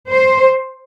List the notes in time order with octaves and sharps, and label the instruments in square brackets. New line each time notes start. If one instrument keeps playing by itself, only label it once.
[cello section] C5